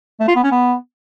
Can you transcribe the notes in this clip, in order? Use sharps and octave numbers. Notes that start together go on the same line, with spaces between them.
A3
F4
B3
C#4
B3